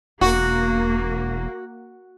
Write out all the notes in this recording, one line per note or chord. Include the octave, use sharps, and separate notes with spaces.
E1 A#3 F#4